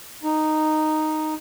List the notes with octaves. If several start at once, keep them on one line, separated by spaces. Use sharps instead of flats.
D#4